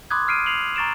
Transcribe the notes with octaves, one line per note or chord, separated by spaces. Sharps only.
B5 C6 D6 D#6 F#6 G#6
D#6 F6 C7 D7 D#7
C7 F7 F#7
A#5 C#6 A6 D7 E7